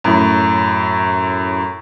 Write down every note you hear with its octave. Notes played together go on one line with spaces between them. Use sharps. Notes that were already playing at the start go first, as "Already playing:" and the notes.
F#2 A2